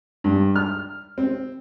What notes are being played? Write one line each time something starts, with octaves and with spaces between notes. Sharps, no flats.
G2
F6
C4